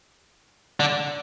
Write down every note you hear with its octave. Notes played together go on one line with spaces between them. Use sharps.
D3